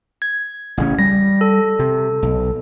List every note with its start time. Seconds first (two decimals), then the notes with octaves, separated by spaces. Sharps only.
0.22 G#6
0.77 A1 C#3 C#4
0.99 G3 A#6
1.41 A4
1.79 C3
2.22 B1